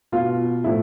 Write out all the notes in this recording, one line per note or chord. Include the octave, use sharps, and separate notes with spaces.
B2 F4
A2 F3 E4